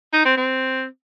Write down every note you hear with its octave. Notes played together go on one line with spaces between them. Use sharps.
D#4
C4
C4